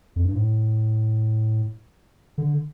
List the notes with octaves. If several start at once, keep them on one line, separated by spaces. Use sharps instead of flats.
F2
G2
A2
D3